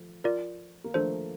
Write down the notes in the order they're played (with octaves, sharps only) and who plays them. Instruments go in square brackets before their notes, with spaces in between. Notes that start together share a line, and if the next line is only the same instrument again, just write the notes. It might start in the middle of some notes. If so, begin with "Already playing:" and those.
Already playing: [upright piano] F3 A3
[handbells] F4 A#4 D5
[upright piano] A#3
[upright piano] F3 A3 [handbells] D4 A4 C5